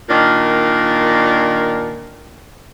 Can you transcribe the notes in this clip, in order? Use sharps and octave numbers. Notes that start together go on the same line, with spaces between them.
A#2 D#3 D4 A#4